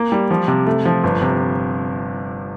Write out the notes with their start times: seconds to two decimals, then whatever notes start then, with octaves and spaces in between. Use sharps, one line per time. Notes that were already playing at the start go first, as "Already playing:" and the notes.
Already playing: A#3
0.12 G3
0.30 F3
0.48 C3
0.67 A3
0.85 F3
1.04 G1
1.22 C3